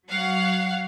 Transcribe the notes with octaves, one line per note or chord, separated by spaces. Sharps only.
F#3 F5 F#5